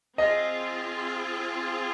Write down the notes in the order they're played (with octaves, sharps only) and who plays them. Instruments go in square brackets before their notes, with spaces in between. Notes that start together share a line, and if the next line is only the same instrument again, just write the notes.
[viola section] C4 F4 G#4 [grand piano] D#5